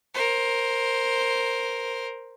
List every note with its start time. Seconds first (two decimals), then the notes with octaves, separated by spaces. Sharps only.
0.14 A#4 C5